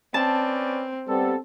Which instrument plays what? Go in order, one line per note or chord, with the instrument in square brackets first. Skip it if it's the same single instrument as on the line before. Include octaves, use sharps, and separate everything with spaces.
[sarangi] C4 [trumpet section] C#4 B4 D5 [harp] A5
[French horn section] G3 B3 C4 [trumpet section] A4